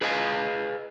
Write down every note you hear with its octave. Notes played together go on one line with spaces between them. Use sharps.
G#4 B4 D#5 F5 F#5 G#5